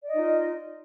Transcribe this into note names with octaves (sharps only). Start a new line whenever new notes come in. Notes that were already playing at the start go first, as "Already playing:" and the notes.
D#4 F4 D5 D#5